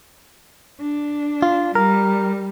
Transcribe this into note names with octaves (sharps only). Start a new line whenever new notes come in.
D4
F4
G3 A#4